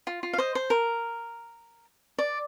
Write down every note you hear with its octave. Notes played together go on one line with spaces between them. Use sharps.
F4
F4
F5
C5 D#5
C5
A#4
D5